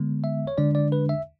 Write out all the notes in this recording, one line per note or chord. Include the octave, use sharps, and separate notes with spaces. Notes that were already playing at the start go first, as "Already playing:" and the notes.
Already playing: D3 G#3 B3
E5
C#5
D3 G#3 D4 D5
D5
B4
E5